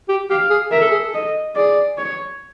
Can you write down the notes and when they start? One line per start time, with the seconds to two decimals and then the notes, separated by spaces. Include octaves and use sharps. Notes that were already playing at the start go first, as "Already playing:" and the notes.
0.09 G4
0.30 G4 F5
0.50 G#4
0.71 A#4 E5
0.81 A4
0.91 G#4
0.99 A4
1.14 D#5
1.55 G#4 D5
1.98 C#5